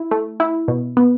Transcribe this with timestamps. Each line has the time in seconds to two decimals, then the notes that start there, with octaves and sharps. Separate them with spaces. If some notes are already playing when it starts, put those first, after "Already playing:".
Already playing: E4
0.11 A3
0.40 E4
0.68 B2
0.97 B3